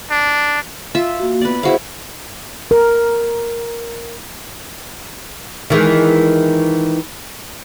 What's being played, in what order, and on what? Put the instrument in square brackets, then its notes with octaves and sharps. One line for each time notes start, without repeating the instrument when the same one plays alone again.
[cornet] D4
[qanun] F4 E5
[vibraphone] A#3 F#4
[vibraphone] B3 [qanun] B4 D5
[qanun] E4 F#4 F5 [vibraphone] G#4 C5 E5
[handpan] A#4
[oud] D#3 E3 G#3